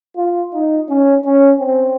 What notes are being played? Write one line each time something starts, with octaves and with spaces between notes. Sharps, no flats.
F4
D#4
C#4
C#4
C4